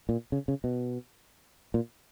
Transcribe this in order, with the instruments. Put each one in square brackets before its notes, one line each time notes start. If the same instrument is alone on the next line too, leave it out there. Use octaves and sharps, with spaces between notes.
[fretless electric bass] A#2
C#3
C#3
B2
A#2